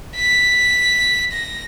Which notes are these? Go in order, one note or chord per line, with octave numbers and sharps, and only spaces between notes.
B6
A#6